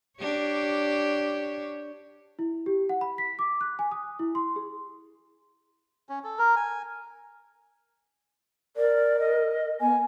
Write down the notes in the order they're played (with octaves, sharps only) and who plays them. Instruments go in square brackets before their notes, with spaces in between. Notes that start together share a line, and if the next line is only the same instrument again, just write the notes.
[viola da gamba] D4 G4 C#5
[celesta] E4
G4
F#5
B5
B6
D6
F#6
G#5
D#6
E4
C6
G#4
[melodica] C#4
A4
A#4
G#5
[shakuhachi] A#4 [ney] D5
[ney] D#5
[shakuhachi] B3 [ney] G#5